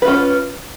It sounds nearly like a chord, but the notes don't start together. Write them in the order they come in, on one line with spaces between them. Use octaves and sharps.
B4 F4 C#4